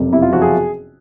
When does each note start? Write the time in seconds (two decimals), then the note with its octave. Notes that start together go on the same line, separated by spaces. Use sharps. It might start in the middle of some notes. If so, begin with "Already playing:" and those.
Already playing: F#1 F2 C3
0.13 C3 E4
0.22 F4
0.32 F3 F#4
0.42 G#4